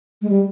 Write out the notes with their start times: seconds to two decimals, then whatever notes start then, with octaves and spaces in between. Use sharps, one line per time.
0.22 G#3
0.30 G3